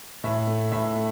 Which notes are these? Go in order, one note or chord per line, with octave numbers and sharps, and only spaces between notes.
A2 E5
A3
A2 E5
A3